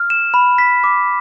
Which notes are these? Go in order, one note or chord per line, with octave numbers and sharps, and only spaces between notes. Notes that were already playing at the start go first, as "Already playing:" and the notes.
Already playing: F6
E7
B5
B6
D6